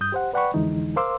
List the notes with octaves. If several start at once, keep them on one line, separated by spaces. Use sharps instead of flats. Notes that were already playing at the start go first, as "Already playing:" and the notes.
G2 D#6 G6
G4 C5 F#5
B4 D5 F#5 G5 B5 C#6
F2 D3 E3 G#3 D#4
A#4 C5 F5 C6 D6 E6